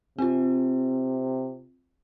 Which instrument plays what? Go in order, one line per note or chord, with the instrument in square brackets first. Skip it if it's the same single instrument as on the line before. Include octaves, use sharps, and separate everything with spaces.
[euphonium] C3 [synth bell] C4 F4